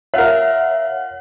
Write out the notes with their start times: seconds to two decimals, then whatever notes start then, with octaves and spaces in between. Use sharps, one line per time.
0.14 F4 A#4 C#5 E5 F#5